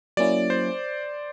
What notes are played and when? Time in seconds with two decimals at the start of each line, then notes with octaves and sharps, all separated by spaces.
0.17 F#3 A#3 C#4 E4 D5
0.50 C5